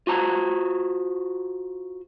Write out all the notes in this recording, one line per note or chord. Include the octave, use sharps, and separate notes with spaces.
F4 F#4 C5 A5 A#5